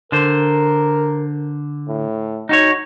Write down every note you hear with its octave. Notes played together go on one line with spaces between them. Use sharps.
D3 A#4 C5
A2
D#4 F#4 C#5